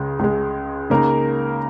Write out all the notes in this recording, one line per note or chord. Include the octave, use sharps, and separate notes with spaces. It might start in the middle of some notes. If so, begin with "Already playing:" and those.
Already playing: C#2 C#3 G#3
C#2 C#3 G#3
C#3 A#3 D#4 A#4